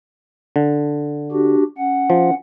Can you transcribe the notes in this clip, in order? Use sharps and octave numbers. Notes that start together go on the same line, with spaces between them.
D3
D4 F#4 G4
C#4 F#5
F3